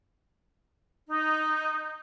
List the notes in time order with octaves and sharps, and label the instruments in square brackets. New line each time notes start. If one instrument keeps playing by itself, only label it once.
[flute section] D#4